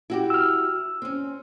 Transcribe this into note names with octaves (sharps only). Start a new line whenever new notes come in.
E4 F#4 G4
E6 F6
C4 C#4